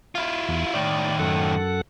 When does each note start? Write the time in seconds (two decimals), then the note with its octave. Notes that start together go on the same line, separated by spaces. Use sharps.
0.15 E4 F4
0.49 E2
0.74 A2 D#3 D5
1.20 F#2 A4 F#5